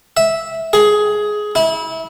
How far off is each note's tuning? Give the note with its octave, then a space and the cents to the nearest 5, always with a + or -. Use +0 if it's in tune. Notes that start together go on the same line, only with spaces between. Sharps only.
E5 -10
G#4 +15
E4 -25